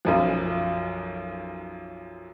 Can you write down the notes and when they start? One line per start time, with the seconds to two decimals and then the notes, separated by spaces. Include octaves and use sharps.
0.05 B1 F#2 F3